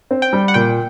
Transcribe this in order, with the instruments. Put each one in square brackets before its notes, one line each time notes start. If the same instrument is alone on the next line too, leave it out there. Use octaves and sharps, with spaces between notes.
[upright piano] C4
[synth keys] G5
[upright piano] G3
[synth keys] F#5
[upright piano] A#2 [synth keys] G5